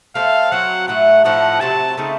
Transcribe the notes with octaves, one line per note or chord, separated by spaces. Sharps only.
A3 C4 F#4 A4 F5
F#3 C4 F#4 F#5
A2 F#3 A3 F#5
A2 F3 A3 D#4 F#5
C3 F#3 C4 A5
C#3 A3 C4 D#4